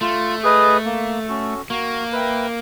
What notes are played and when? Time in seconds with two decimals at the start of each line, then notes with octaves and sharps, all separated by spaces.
0.01 A3 F4
0.43 G#4 B4 D#5
0.85 A#3
1.28 C#4 F#4 A4
1.70 A#3 F#4
2.12 B4 E5 G5